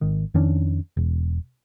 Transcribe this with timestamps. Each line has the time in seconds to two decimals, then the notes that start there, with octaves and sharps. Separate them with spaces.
0.01 G#1 D#3
0.34 F2 D#3 C#4 D4
0.97 E1